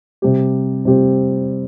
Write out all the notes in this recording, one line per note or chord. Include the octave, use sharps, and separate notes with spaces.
C3 G3 C4 G4
C3 G3 C4 G4